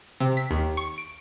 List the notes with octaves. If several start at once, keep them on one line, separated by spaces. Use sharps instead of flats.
C3
B6
D#2
C#6
D7